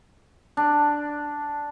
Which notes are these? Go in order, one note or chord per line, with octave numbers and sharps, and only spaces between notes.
D4